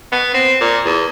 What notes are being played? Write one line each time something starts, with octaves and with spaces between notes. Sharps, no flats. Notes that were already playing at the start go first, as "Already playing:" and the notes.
B3
C4
A#2
E2